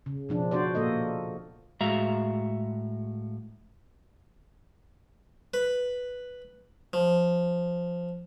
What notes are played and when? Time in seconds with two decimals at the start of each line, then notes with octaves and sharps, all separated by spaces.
0.06 C#3
0.29 B2 F3 D4
0.51 D4 F#4 C5 D5
0.75 A#2 A#3 A4 D#5
1.81 A2 G#3 F#4 E5 F5 A#5
5.54 B4
6.93 F3